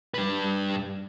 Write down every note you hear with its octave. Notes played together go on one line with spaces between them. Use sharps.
G2 B4